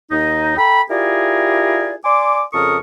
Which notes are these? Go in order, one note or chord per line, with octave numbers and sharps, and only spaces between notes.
D#2 D#4
A4 G5 A#5 B5
E4 F4 G4 G#4 A#4 D5
D5 G#5 C6 D6
F2 C#3 A4 A#4 C#6 D#6